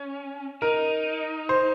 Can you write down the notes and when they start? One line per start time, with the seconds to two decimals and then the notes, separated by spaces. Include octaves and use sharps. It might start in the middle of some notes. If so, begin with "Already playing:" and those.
Already playing: C#4
0.62 D#4 A#4
1.49 C5